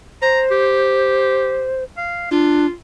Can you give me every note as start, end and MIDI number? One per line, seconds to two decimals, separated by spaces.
0.22 1.84 72
0.22 0.41 82
0.50 1.76 67
1.97 2.29 77
2.31 2.66 62
2.31 2.72 65